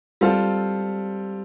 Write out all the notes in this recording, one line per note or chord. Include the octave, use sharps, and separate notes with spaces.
G3 C4 F4 A4